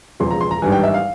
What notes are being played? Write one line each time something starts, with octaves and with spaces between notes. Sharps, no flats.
E1 E2 C#3 F3 C6
A#5
C6
A#5
G#1 G2 E3 G#5
G5
E5
F5